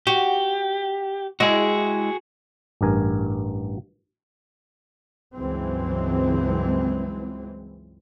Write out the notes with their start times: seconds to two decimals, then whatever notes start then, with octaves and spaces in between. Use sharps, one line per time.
0.07 F#4 G4
1.40 G#3 E4 F#4 G#4 D#5
2.81 A1 G2 A#4 G#5
5.35 C#2 G2 E3 F#3 G#3 C4